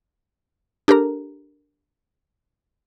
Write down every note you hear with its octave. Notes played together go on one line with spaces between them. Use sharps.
D4 G4 A4 A#4 A#5